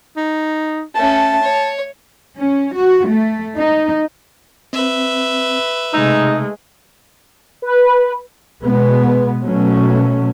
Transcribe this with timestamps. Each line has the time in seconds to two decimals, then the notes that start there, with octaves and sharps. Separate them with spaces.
0.17 D#4
0.95 A3 C#4 A5
1.42 C#5
2.37 C#4
2.75 F#4
3.07 A3
3.57 D#4
4.73 C4 B4 E5
5.94 C3 G#3 A3 D#4 E6
7.62 B4
8.62 B2 G#3 B3
9.44 B2 F#3 A3 C#4